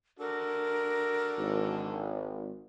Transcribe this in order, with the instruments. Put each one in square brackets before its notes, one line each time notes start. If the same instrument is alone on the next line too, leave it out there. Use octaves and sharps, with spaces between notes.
[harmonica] D4 F#4 A4 [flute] A#4
[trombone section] G#1